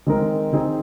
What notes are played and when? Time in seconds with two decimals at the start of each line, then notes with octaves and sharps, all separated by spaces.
0.07 D#3 G#3 C4 D#4 A#4
0.53 D#3 C4 D#4 G#4